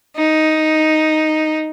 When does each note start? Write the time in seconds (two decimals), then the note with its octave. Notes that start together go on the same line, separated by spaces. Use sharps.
0.16 D#4